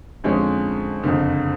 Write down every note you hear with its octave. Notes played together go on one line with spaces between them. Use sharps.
F2 D3 F3 G#3 C#4
F#1 F2 D3